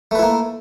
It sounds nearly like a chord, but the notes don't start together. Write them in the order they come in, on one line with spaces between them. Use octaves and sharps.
A3 B4 E4 A#3